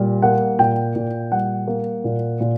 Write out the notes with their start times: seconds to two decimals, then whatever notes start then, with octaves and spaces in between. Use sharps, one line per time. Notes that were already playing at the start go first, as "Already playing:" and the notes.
Already playing: A#2 G3
0.22 A#3 F#5
0.59 A#2 G5
0.96 A#2
1.32 G3 F#5
1.67 A#3
2.04 A#2
2.41 A#2